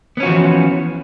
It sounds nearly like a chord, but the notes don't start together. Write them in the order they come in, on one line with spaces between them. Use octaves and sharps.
B3 C#4 F#4 F3 E3